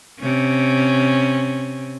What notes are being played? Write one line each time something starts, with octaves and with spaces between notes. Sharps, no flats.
C3 C#4